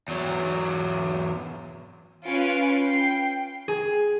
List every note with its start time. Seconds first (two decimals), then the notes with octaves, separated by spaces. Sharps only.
0.08 E2 F#3
2.25 C#4 F4 B4 G#5 C#7 D7
2.82 G5 C7
3.68 G#4